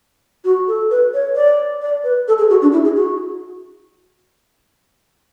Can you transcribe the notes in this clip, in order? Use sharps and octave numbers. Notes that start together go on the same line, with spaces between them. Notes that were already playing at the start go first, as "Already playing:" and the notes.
F#4
A4
B4
C#5
D5
D5
B4
A4
G#4
F#4
D4
E4
G#4
F#4